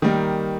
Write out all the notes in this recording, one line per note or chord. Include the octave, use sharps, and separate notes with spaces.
D#3 G3 A#3